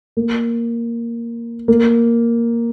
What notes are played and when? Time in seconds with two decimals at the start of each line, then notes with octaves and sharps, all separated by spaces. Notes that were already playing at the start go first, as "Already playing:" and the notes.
0.17 A#3
1.68 A#3